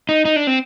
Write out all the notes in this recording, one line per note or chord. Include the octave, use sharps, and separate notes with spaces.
D#4
D#4
D4
C4